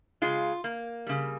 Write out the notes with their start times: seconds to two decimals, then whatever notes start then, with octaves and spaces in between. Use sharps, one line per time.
0.22 C#3 G#3 F4
0.64 A#3
1.07 C#3 G3